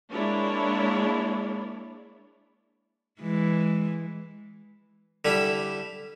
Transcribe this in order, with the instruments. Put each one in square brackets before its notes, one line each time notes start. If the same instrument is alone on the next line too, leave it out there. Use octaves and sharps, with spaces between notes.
[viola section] G#3 A#3 D4 E4 C#5 D5
[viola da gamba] E3 G#3
[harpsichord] D3 G3 E4